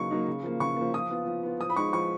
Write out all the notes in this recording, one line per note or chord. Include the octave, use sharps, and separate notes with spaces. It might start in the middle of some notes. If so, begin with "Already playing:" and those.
Already playing: C#3 F#3 A#3 D#4 C#6
F#3 A#3 D#4
C#3
F3 A#3
C#3 C#6
F3 A#3
F3 D#6
B3 F4
F3
B3 F4
F3 D#6
B5
G#3 D#4 C#6
F3 C#6